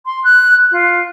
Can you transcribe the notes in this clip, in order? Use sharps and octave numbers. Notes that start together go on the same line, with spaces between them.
C6
F#6
F4